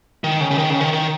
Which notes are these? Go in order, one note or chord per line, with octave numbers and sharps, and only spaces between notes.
D#3
C#3
C#3
D#3
C#3
D#3
D#3